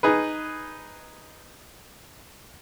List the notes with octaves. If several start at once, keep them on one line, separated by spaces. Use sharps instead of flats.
D#4 G#4 B4